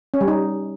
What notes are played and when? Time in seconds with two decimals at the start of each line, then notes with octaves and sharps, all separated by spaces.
0.14 C#4
0.21 G3
0.28 D#4